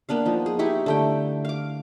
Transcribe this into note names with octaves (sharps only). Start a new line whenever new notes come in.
A#3 B3 D4 F5
F3 D#4
G#4
D#4 E4 G4 C#6
D3 A3 G5
F5 D6